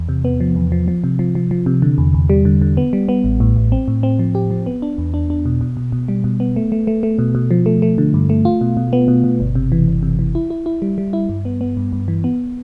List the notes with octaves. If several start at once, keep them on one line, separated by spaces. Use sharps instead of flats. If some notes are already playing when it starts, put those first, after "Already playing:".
Already playing: E2
C3
B3
F3
E2
F3
F3
C3
F3
F3
F3
C3
D3
E2
E2
G3
D3
D3
B3
G3
B3
A1
A2
A1
C4
A2
C4
F3
G4
F3
B3
D4
E2
D4
D4
B2
B2
B2
B2
G3
B2
B3
A3
A3
A3
A3
B2
B2
F3
A3
A3
D3
G2
A3
F4
B2
B2
B3
B2
B2
G1
C3
E3
G1
C3
E3
E4
E4
E4
G3
G3
E4
G2
B3
B3
G2
G2
E3
B3